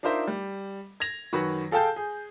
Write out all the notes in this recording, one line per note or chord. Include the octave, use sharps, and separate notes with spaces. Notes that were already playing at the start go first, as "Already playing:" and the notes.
D4 D#4 F4 A#4 C5 E5
G3
G#6 A#6 F7
F#2 D#3 F#4 B4 F#5
G#4 A4 F5 G5 A5 G6
G#4